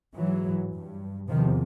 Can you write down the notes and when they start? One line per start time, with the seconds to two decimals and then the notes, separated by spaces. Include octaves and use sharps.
0.16 G#2 E3 F#3
0.73 G2
1.29 E2 C3 D#3 F3